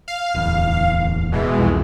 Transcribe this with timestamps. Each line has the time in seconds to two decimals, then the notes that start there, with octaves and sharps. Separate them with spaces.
0.08 F5
0.35 D1 E2
1.32 B2 E3 G#3
1.59 C2 F2